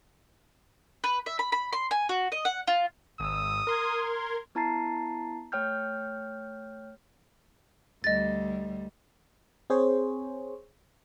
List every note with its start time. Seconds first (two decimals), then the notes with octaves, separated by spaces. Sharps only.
1.04 B4
1.26 E5
1.39 B5
1.52 B5
1.73 C6
1.91 G#5
2.09 F#4
2.32 D#5
2.45 F#5
2.67 F4
3.20 G#1 D#6 E6
3.67 A#4 C6 G#6
4.55 B3 E4 A5 A#5 A6 C7
5.52 A3 C#5 G5 F6 G6
8.04 D2 G3 D#5 A6
9.70 C4 G#4 C5 C#5